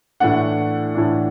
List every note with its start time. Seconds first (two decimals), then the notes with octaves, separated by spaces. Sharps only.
0.20 A2 E3 A3 D4 F#5
0.95 A2 E3 A3 D4